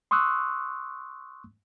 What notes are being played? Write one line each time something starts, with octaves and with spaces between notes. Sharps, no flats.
C6 C#6 D#6 E6 F#6